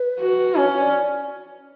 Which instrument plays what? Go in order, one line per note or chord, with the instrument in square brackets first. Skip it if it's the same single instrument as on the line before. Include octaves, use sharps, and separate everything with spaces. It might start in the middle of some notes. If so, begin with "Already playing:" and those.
Already playing: [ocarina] B4
[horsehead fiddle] F#4
[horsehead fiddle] C#4 [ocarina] C#5
[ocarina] D5